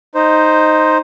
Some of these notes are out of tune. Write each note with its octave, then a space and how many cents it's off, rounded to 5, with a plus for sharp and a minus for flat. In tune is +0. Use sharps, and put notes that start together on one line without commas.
D#4 +0 C5 +0